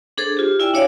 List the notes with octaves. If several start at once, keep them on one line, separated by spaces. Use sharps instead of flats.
D4 G#4 A4 C5
F4 G4
E4 D5 E5 G5 G#5
D4 F#4 C#5 D5 F5